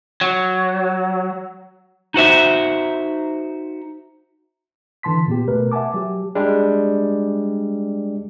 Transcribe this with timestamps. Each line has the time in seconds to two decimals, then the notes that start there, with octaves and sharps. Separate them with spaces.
0.21 F#3
2.14 D#4 F#4 C5 E5
5.03 D3 E3 A5 C6 B6
5.27 A#2 B3 G4
5.48 B2 A3 A#4 B4
5.72 E5 F#5 G#5 A5 D6
5.94 F#3 G4
6.35 G3 G#3 D4